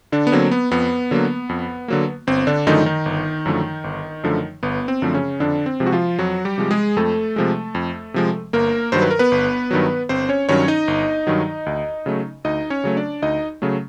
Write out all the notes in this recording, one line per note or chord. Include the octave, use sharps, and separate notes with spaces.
D3 D4
B3
D3 F#3 A#3 C4
B3
F2 B3
D3 F#3 A#3
F2
D3 F#3 A#3
G1 C4
D3 D4
F#2 D3 D#3 F3 A3 D#4
D#3 D#4
G1
F#2 D3 F3 A3
G1
F#2 D3 F3 A3
G1 B3
C4
F#2 D3 F3 A3
C#3 C#4
F2 D3 D4
C4
C3 F3 G#3
F#4
F3 F4
F2 F#3 F#4
G3 G4
C3 F3 G#3
G#3 G#4
F2 A3 A4
C3 F3 G#3
F2
C3 F3 G#3
G1 A#3 A#4
G2 D#3 F#3 C5
B4
A#4
B3 B4
G1
G2 D#3 F#3
G1 C4 C5
C#4 C#5
G2 D#3 F#3 C#4 C#5
D#4 D#5
G1
G2 D#3 F#3
D2
C#3 F#3 A3
D2 D#4 D#5
C#4 C#5
C#3 F#3 A3
D4 D5
D2 D#4 D#5
C#3 F#3 A3